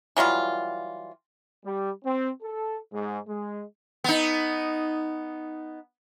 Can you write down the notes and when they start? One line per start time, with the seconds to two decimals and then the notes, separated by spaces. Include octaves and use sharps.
0.17 E3 F#3 G3 F4
1.65 G3
2.04 C4
2.42 A4
2.92 G#2
3.28 G#3
4.04 B3 D#4